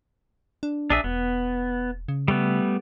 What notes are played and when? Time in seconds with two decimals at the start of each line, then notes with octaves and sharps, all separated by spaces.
0.63 D4
0.90 A#1 D4 G#4 E5
1.04 E1 B3
2.08 C#3
2.28 G3 A3 B3